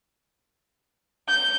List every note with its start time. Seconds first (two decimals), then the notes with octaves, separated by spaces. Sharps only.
1.27 G6